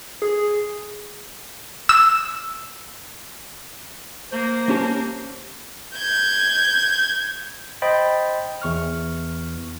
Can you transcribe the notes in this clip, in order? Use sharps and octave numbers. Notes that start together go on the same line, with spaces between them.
G#4
E6
A#3 C5
C#4 G4 A5
G6 G#6
C5 D#5 G5 B5 A6
E2 C#6 F6